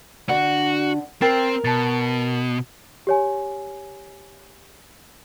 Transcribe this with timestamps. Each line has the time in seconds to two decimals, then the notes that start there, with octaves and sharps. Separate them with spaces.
0.29 D3 D4 F#4 F#5
1.22 C4 A#4 G5 A6 C7
1.64 B2 A5 A6
3.07 G4 C#5 G#5